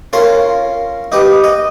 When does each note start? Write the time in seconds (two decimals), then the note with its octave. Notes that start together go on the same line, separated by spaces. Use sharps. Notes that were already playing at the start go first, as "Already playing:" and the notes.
0.13 C#4 F4 A#4 A#5 C6
1.12 D#4 G4 B4
1.44 D#5